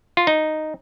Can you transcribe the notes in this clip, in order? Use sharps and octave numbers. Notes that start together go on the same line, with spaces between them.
F4
D#4